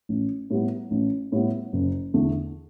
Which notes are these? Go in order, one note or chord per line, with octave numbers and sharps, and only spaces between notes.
A1
A2 G3 B3
A1
A2 G3 B3
F#1
E2 D3 A3